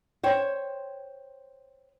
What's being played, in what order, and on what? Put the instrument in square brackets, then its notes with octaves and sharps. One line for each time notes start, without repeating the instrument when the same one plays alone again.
[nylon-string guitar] C5 C#5 G5